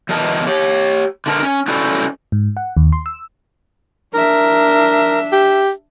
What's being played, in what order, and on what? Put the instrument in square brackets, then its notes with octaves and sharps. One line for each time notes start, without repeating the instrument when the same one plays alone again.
[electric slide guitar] E2 B2 E3 A#4 D#5 A5
G4 C#5
D3 D4 A#4
C#4
C#4 E4 F#4 A4 C5 D5
[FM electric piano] G#2
F#5
D#2
C6
E6
[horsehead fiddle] D4 E5 [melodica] A#4
[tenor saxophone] G4